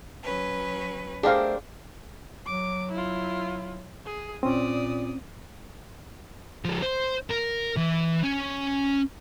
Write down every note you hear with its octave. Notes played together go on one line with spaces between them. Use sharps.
F#3 C#4 B4
A3 D4 G4 G#4 A#4 C5 F5
F#3 D6
E4 F4
G#4
A#2 C4 C#4 D5 D#6
F3 G#3
C5
A#4
E3
C#4